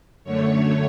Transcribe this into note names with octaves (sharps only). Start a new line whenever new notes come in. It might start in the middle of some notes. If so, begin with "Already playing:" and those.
F#2 D3 A3 C#5